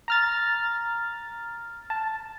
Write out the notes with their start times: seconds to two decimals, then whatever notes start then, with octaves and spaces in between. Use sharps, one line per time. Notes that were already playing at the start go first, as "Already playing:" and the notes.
0.08 A#5 F6 A6
1.90 A5